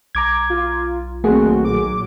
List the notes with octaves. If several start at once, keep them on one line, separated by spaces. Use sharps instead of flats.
B1 A#5 D6 G#6
F4
D#3 F#3 A3 A#3 C4 F#4 G#4
A#2 F#3 D6